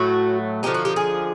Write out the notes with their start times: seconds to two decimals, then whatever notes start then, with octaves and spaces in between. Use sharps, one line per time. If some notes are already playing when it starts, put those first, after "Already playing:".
Already playing: A2 F#3 A3 F#4
0.63 D3 F3 A#3 D#4 G4
0.74 F#4
0.85 G4
0.96 G#4